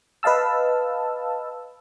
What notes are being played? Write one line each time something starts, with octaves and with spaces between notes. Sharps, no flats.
B4 D#5 F5 A5 E6